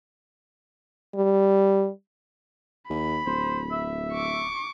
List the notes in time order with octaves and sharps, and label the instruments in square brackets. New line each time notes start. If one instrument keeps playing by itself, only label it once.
[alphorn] G3
[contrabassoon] D#2 [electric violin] B5
[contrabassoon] D1 [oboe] C5
[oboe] E5
[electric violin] C#6 D6